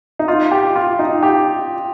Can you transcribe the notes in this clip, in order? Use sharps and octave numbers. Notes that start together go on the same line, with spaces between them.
D#4
F4
G4
F4
D#4
G4